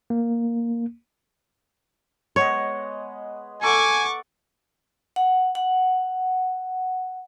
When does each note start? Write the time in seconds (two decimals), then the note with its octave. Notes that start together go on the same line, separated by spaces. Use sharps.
0.10 A#3
2.36 G#3 B3 C#5 D#5
3.63 A4 F#5 G#5 C#6 D6
5.16 F#5
5.55 F#5